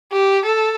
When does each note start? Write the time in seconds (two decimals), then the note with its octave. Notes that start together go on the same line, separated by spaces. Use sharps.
0.12 G4
0.45 A4